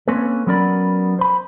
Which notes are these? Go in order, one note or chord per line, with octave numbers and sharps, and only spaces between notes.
A#3 C4 C#4 A4 B4
F#3 B3 C#4 A#4 D5 B5
C5 B5